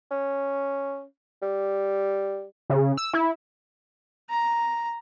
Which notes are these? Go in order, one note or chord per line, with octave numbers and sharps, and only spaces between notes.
C#4
G3
C#3
E6
E4
A#5